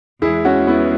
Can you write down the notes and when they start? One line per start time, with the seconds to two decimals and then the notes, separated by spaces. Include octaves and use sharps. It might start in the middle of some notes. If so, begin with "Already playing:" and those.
0.22 E2 E3 G#3 E4 G#4
0.45 C#4 F#4
0.67 B3 E4